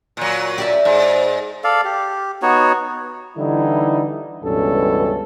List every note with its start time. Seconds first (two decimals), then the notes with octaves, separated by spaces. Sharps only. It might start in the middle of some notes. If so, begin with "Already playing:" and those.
0.17 A#2 F#3
0.58 G4 D5 E5
0.85 G#2
1.64 A4 D5 F5
1.85 G4
2.42 B3 D#4 F#4 C#5
3.37 D3 E3 G3 D#4 E4
4.44 C#2 G2 B2 E3 C#4 A4